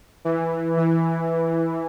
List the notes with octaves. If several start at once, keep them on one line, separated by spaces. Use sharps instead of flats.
E3
E3